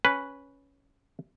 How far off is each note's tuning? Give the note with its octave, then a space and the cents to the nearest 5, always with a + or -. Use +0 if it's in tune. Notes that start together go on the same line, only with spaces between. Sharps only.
C#4 +0 B4 +0